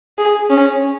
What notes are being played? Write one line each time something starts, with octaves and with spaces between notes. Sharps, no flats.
G#4
C#4